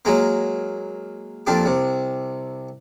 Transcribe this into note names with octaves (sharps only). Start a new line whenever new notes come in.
F#3 G#3 A#3
F2 A#2 D4 G4
C2 C3